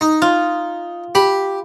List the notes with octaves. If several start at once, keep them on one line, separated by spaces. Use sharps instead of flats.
D#4
F4
G4 B5